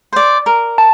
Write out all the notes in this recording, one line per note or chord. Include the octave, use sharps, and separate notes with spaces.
C5 D5
A#4
A5